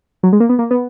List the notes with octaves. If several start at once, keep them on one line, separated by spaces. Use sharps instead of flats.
F#3
G#3
A#3
B3
A#3
B3